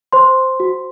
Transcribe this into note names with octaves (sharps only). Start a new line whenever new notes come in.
C5 C6
F#4